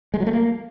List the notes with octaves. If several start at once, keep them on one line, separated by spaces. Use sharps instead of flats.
G#3
F#3
A3
A#3